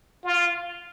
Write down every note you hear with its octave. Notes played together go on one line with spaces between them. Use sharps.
F4